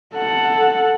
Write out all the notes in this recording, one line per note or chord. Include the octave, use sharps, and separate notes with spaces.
A4 F#5